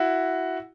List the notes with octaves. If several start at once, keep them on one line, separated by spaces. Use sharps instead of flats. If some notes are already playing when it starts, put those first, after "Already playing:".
Already playing: E4 F#4